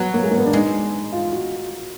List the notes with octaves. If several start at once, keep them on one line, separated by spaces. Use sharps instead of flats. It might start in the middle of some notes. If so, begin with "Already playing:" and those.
Already playing: F#3 B3
A#3
G#3
A#3
B3
D4
G#3 D#4
F4
F#4